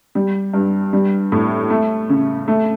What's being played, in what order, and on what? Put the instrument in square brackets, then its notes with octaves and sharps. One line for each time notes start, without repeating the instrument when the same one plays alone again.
[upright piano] G3
G2
G3
A2
A3
C#3
A3